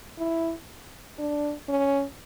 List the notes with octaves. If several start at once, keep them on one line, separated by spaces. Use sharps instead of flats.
E4
D4
C#4